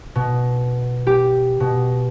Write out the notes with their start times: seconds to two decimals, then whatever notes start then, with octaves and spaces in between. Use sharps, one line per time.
0.15 B2
1.07 G4
1.60 B2